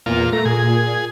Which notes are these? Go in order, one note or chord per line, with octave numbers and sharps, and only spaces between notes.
E2 A#2 F4
A3 A#5
A#2 G#4